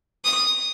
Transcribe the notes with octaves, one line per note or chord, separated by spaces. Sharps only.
D#6